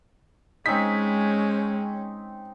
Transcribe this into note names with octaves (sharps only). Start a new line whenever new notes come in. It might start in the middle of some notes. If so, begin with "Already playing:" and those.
G#3 C4 C#4 D#4 B6